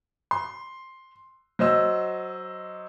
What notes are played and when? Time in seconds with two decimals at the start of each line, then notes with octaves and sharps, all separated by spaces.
0.31 C6
1.59 F#3 C5 D#5 E6